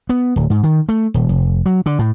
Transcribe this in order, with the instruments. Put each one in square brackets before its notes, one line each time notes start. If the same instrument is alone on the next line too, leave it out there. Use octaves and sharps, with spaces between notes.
[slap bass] B3
D1
G#2
D#3
A3
D#1
F1
F#3
D3
A2